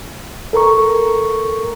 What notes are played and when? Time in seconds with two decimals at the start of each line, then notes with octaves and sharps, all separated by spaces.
0.53 A4 A#4 A#5 C#6